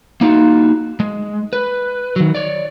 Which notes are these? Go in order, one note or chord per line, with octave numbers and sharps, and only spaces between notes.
A#3 D#4 F4 F#4
G#3
B4
D#3 F#3
C#5 D5